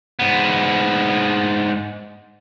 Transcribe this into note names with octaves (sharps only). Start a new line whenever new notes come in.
G#2 B3